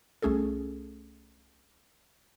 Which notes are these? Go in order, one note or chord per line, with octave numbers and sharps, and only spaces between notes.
C2 A3 C#4 G#4 A4